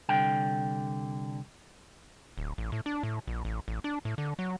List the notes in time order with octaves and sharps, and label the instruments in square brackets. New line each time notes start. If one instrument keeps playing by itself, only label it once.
[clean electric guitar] C2 D3 G5
[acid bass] D1
A1
A2
D4
A2
A#1
A1
A1
D4
A2
D3
F#3